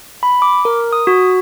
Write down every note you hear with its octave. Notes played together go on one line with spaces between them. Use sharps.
B5
D6
A#4
D#6
F#4